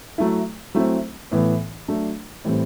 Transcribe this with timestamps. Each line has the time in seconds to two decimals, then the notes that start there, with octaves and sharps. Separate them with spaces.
0.18 F#3 A3 E4
0.75 F#3 A3 C4 E4
1.31 A2 E3 B3
1.88 F#3 A3 D4
2.45 A2 E3 G3 C4